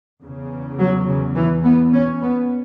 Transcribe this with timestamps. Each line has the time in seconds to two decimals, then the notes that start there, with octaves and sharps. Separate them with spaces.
0.21 E2 C#3
0.78 F#3
1.06 C#3
1.35 E3
1.64 B3
1.93 C#4
2.22 B3